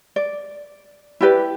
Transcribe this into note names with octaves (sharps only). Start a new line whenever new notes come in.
D5
E4 G4 B4 D5